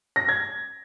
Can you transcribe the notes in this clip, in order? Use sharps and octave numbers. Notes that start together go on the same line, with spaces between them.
A#6
G#6